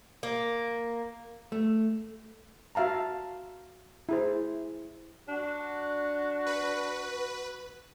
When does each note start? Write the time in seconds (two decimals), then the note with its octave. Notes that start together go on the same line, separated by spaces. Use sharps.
0.23 A#3
1.52 A3
2.75 F#4 E5 F5 A5 A#5
4.09 E4 G#4 C5
5.29 D4 F#4
6.47 B4